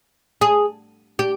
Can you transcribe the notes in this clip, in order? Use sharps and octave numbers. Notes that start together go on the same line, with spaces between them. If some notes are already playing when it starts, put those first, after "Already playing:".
G#4
G4